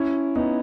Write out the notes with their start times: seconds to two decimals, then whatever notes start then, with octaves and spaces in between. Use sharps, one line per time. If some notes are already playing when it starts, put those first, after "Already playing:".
Already playing: C#4 E4
0.36 B3 D#4